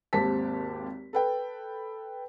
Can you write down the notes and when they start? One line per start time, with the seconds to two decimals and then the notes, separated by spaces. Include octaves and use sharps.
0.13 G#1 D#2 C4 G4 A5 B6
1.13 A4 B4 G5